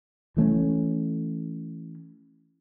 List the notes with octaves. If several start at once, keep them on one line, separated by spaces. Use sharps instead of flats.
E3 A3 C4 C#4